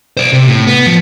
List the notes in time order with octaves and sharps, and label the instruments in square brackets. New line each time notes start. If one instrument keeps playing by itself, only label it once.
[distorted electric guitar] C5 D5
C3
A2
B3
F3